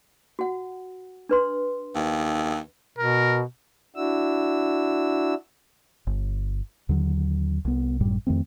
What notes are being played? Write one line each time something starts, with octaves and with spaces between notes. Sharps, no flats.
F#4 F#5
D4 B4 C6
D#2
B2 A#4
D4 E4 F#4 E6
G1
D#2 D3 F#3
C2 B3
G#1 F#2 A2 G3
F2 D#3 A3 C4